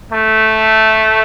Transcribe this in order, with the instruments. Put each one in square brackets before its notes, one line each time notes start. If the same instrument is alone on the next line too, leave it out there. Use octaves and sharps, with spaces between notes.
[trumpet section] A3